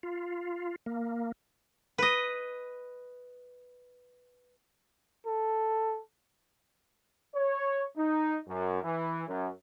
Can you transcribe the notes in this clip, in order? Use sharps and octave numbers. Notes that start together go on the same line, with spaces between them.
F4
A#3
B4 D#5
A4
C#5
D#4
F#2
E3
F#2